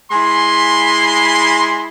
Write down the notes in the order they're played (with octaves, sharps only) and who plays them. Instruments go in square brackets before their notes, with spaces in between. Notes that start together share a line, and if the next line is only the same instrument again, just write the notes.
[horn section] G#3 E4 G#5 B5 C6